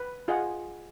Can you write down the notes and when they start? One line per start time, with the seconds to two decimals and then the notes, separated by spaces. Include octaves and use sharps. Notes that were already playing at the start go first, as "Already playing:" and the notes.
Already playing: B4
0.28 F4 G#4 D#5 F#5